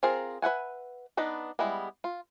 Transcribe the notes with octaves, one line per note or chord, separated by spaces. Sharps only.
C4 F4 G#4 A#4
B4 E5 F#5 G#5
B3 D4 D#4 B4
G3 G#3 B3 E4
F4